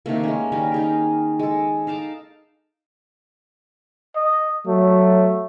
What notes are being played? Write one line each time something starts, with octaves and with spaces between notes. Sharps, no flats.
C3 D#3 A3 A#3
G#3 C#4
D#3 G3 C#4 A#4
D#4 G#4 G5
G#3 A4
D#4 F5 A5 D6
D#5
F#3 A3